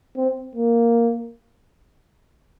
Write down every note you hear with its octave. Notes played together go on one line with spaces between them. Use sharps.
C4
A#3